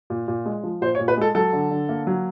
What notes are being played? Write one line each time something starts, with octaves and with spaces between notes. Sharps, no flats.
A#2
A#2
G#3
F3
A#2 C5
C#5
A#2
B4
G#3 A4
F#3 A4
D3
D3
A#3
F#3